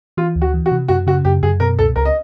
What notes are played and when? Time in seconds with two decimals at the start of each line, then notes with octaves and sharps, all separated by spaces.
0.17 E3 F4
0.36 D2
0.42 F#4
0.54 E3
0.66 F#4
0.72 C3
0.88 F#2 F#4
1.07 C#3 F#4
1.25 F#2 G4
1.43 F#2 G#4
1.60 B2 A#4
1.79 C#2 A4
1.96 C#2 A#4
2.05 D#5